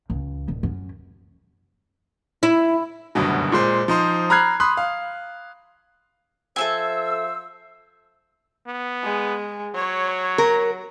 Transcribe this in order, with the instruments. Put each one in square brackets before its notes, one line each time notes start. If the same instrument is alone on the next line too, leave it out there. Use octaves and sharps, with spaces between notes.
[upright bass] C#2
D1
F#2
[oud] E4
[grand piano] F#1 D2 G2 B2 F#3
A#2 G#3 C5
F3 D#4 C5
A#5 B5 F6 F#6 G#6 C7
B5 C6 D#6 F#6
F5
[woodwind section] F3 C5 E6 [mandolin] A4 E5 G#5
[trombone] B3
[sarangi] G#3
[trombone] F#3 [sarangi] C#5
[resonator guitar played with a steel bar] A#4